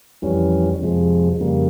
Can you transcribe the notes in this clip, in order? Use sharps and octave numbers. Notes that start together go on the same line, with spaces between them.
F2 E3 G3 C#4
F2 C3 F3 G#3
F2 C#3 G3 A#3